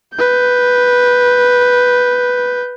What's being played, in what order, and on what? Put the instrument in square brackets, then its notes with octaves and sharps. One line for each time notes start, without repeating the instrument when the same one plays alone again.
[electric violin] B4 G6